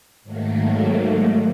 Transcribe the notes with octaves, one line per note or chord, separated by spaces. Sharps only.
G#2 D#3 F#3 A3 A#3